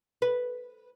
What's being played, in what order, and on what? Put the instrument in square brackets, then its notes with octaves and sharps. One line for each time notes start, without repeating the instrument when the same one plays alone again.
[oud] B4